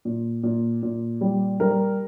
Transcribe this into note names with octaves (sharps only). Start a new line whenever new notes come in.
A#2
A#2
A#2
G3
G3 A#4